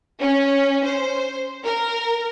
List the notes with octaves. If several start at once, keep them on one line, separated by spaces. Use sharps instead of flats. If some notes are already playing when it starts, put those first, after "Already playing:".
C#4
C5
A#4